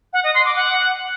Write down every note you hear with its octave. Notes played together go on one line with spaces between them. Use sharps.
F#5
D#5
C6
D6
F#5